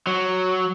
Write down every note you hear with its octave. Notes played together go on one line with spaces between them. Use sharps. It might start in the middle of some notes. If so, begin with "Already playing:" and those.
F#3